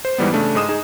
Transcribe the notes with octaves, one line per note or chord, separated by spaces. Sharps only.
C5
G#2 E3 G3 B3
C#3 A3 D4
G#2 G#3 D#6 E7
D#4 G#4